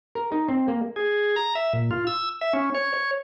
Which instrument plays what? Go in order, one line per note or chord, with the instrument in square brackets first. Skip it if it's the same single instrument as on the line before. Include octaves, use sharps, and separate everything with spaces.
[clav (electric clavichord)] A#4
D#4
C4
A#3
[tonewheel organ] G#4
A#5
E5
A#2
F4
E6
E5
C#4
C#5
C#5